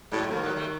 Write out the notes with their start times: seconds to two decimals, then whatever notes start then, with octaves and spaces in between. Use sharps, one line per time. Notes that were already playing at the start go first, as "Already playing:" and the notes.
0.12 A2 F#3 G#3
0.31 D#3 F3 G3
0.44 F#3 G#3
0.56 G3 A3